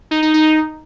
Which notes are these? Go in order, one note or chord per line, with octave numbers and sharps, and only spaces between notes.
D#4
D#4
D#4